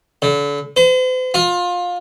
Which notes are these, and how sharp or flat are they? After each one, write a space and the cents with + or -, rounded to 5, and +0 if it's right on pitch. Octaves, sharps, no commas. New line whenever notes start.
D3 -40
C5 -45
F4 +25